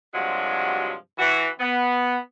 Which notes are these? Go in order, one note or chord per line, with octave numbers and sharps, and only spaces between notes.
G2 C3 F3 F#3 G#3 F#4
E3 F#4
B3